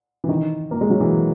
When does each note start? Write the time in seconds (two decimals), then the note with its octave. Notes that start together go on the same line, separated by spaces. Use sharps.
0.24 E3
0.29 D#3
0.71 A#3
0.81 G#3
0.90 F#3
1.00 E3